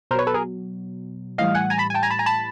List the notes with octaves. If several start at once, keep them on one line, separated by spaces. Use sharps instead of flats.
B2 F#3 A#4 B4 C5 C#5
A4 B4
G#4 A#4
A2 E3 G3 D#5 F5
F#5 G#5
G#5 A#5
A5 B5
G#5
G5 A5
G#5 A#5
A5 B5
G#5 A#5
A5 B5